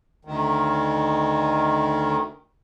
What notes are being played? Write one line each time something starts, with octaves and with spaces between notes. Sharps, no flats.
D2 D#3